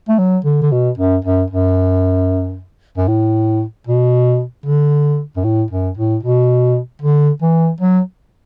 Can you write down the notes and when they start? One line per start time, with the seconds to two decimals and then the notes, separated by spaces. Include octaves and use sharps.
0.09 A3
0.19 F#3
0.45 D3
0.62 D3
0.72 B2
0.98 F#2
1.25 F#2
1.51 F#2
2.97 F#2
3.08 A2
3.87 B2
4.66 D3
5.36 F#2
5.44 A2
5.71 F#2
5.97 A2
6.23 B2
7.02 D3
7.42 E3
7.81 F#3